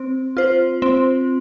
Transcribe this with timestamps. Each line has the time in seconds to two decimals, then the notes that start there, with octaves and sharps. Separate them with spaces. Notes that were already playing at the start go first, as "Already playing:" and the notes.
Already playing: C4
0.37 F4 C5
0.82 C4